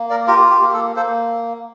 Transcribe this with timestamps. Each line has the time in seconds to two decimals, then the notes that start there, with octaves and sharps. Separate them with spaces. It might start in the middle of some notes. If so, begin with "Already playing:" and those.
Already playing: A#3
0.10 A#4 D5
0.27 F4 G4 A#4
0.50 G4
0.61 A#3
0.68 G4
0.74 A4
0.96 A#3 A4 C5